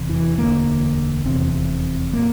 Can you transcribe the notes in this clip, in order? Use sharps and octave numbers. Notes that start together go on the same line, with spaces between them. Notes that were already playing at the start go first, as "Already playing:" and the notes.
Already playing: F1 E2 C3
E3
E1 D2 D3 A#3
F1 E2 C3 C4
A#2 A#3